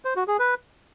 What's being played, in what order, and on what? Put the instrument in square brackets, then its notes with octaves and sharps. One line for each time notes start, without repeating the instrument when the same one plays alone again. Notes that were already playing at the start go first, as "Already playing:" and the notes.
[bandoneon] C5
F#4
G#4
B4